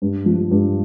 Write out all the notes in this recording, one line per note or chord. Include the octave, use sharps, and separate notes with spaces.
G2
F3
G2